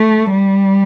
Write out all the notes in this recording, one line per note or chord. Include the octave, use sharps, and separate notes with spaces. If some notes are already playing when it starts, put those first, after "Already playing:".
Already playing: A3
G3